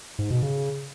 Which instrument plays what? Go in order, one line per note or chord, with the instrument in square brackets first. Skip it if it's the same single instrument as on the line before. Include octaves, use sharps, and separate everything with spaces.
[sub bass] G#2
B2
C#3